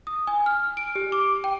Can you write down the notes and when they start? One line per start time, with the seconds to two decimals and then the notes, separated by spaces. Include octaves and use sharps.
0.07 D#6
0.27 G#5
0.46 F6
0.77 D7
0.95 G4
1.12 D6
1.44 G5